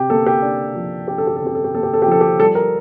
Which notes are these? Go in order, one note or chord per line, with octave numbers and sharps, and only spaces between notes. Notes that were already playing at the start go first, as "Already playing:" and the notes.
Already playing: C3 G4
A#3 A4
G4
D4
F3
D4 G4
A4
G4
A4
C3
G4
A4
G4
A#3 A4
G4
A4
F3 G4
A4
G4
G3 A4
A#4